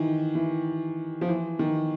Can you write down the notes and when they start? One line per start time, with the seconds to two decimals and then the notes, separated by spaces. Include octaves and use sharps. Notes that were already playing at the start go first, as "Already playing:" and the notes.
Already playing: D#3 E3
0.35 E3
1.21 F3
1.28 E3
1.59 D#3